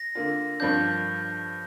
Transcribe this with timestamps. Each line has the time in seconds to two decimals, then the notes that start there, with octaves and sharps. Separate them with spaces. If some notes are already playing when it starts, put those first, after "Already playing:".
Already playing: A#6
0.15 D3 A#3 F4
0.60 G2 F3 A#3 D4 G6